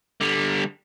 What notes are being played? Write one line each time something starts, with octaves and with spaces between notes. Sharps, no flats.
D3 G3